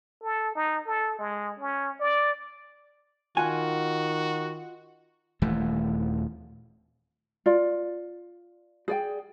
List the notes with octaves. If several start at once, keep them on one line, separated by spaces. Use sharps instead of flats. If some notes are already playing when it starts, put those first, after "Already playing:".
A4
D#4
A4
G#3
C#4
D5
D#3 F4 F#4 F#5 G#5
D#1 E3 A3
F4 D5
G#4 D5 G5